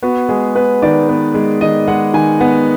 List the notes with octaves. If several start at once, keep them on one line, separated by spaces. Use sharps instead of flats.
B3 F#4
G#3 G#4
B3 B4
D#3 D5
B3
G#3
D#3 D#5
G#3 F#5
D#3 G#5
B3 F#5